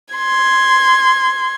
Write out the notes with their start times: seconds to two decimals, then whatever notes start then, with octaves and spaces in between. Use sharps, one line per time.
0.15 C6 G#6